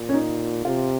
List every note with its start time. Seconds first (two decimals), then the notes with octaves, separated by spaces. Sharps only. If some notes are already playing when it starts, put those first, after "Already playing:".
Already playing: A#2
0.09 C#4
0.13 D#4
0.65 C3 F4